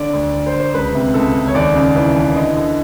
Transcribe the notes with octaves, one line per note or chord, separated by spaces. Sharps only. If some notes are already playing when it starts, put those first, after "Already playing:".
Already playing: D3 D5
D2
D3
C5
D2
C5
C#2 B4
C3
C#2 A4
C#2
C#5
D#2 D5
C#3
E3
E3
D3 D#5
D3